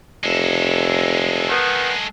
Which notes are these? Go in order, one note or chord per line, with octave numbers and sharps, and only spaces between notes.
F1 G#3 A4
D#3 B3